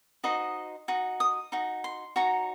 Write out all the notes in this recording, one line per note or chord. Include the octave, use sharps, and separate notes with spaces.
D#4 F#4 C5 D#5
D#4 F#4
D#6
D#4 F#4
C6
D#4 F#4 C#5 A#5